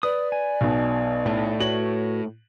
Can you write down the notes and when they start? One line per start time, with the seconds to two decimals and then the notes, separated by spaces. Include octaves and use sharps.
0.03 B4 D5 D#6
0.32 G#5
0.61 B1 B2
1.26 A2
1.60 F#4 B4 C#5 F#7